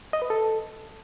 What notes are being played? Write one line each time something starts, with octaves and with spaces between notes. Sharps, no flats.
D#5
B4
A4